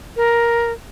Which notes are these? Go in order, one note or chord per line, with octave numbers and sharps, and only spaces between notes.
A#4